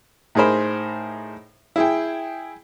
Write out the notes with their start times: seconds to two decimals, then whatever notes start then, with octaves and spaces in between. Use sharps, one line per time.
0.35 A2 D#4 G#4 A#4 C5 B5
1.76 E4 G#4 G5